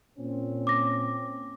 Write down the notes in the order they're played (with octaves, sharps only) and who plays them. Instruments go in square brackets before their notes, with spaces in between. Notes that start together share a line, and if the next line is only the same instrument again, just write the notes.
[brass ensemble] A#2 C4 C#4
[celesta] D6 A#6